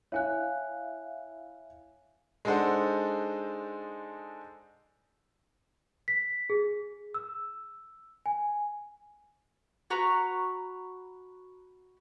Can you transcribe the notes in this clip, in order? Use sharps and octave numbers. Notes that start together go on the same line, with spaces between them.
E4 C#5 F5 G#5 F#6
G#3 D4 D#4 A4 C5 F#5
B6
G#4
E6
G#5
F#4 B4 A#5 C#6